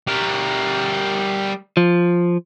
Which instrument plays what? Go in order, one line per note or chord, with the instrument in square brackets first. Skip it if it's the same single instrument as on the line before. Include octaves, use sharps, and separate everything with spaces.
[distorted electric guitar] G3 A#4
[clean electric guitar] F3